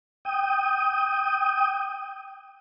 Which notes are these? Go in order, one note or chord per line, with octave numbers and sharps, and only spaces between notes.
G5 D#6